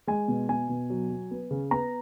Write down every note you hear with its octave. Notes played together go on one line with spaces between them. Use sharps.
G#3 G#5
B2
B2 G#5
B2
F#3
F#3
B3
C#3
B3 A#5